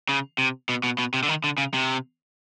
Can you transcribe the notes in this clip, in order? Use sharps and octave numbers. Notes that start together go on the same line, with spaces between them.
C#3
C3
B2
B2
B2
C3
D3
D#3
D3
C#3
C3